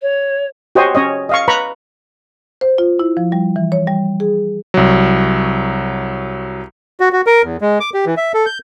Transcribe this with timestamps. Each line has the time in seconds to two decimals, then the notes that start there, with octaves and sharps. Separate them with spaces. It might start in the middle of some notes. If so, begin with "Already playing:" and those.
0.02 C#5
0.75 F#4 G4 C5 C#5 D#5 G#5
0.95 C#4 C#5 D#5
1.29 D#5 F5 C#6
1.48 B4 A#5 B5 C#6
2.61 C5
2.78 F4
2.99 E4
3.17 F3
3.32 G3
3.56 E3
3.72 C#5
3.87 G3
4.20 G#4
4.74 C2 F#3
7.00 F#4
7.12 F#4
7.27 A#4
7.43 E2
7.61 G#3
7.80 D6
7.94 G4
8.06 E3
8.17 E5
8.34 A4
8.46 G6